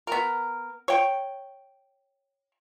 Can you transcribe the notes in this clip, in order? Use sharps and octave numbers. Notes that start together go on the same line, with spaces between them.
B3 A#4
C#5 G5